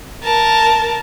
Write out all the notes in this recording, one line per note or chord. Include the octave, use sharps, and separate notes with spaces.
A#4 A5